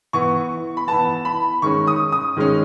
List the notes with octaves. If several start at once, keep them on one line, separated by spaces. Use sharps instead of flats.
E3 B3 C#6
B5
E3 B3 A5
B5
D#3 G#3 C#4 C#6
D#6
D#6
D#3 G#3 C#4